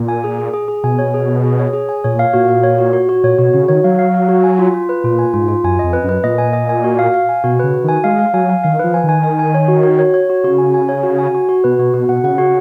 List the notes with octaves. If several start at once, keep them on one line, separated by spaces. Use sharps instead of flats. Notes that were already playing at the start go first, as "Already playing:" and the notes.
Already playing: A#2
G#5
G#4
G#4
G#4
G#4
B2 G#5
C#5
G#4
G#4
G#4
C#5
G#4
G#5
A#2 C#5
F5
A#2 F#4
F5
C#5
F#4
F#4
F#4
A#2 C#5
B2 F#4
C#3 F#4
D#3 C#5
F#3 F5
F5
F5
F#4
G#5
F4
F4
B4
A#2 F4
G#5
G#2 F4
F4
F#2 G#5
F2 D#5
B4
F#2
B4
A#2 D#5
G#5
D#5
G#5
F#4
F5
F5
G#5
B2 F#4
C#3 B4
F#4
D#3 G#5
G#3 F5
F5
F#3 G#5
F5
D#3 F5
F3 B4
G#5
D#3
G#5
G#5
G#5
C#5
F#4
F#4
C#5
C#5
F#4
C#3 F#4
G#5
G#5
C#5
F#4
G#5
F#4
F#4
B2 B4
B2 F#4
B2 F#4
B2 F#5
C#3 F#5
F#4